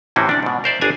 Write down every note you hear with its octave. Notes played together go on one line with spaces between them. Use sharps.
A2 C3 E3 C4 C#4 F#4
D4 D5
G#2 B2
A#4 C5 D5 E5
G1 D4 G#4 G#5 A#5